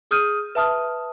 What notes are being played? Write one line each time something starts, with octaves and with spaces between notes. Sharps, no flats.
G#4 D#6 F6 G6 D#7
B4 E5 A5 D#6 F6